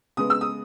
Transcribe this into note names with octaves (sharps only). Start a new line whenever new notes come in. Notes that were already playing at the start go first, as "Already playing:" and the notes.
C#3 G#3 B3 D#6
E6
D#6